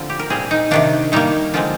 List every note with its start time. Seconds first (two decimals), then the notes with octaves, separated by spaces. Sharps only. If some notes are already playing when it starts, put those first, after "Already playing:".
Already playing: D3 F3 C4 F4
0.10 G4
0.19 A#4
0.30 A#2 G3 C4 G#4
0.51 D#4
0.71 C3 D#3 A#3 D4
1.12 D#3 G3 A#3 D#4
1.54 D3 F3 G#3 C4 F4